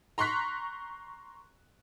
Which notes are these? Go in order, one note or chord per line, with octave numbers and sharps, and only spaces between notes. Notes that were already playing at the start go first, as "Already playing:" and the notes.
A#5 C6 C#6 F#6 B6